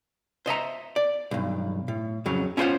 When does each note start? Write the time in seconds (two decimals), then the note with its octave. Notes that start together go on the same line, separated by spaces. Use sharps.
0.46 C5 D#5 E5 A#5
0.96 D5
1.31 B1 G2
1.88 A2
2.26 F2 C#3 F#3
2.57 C#4 E4 F4 G#4 C5 F#5